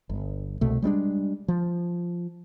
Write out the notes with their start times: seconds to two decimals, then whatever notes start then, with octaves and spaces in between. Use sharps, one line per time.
0.10 G1
0.61 C2 B2 A3
0.82 G3 G#3 C4 D4
1.48 F3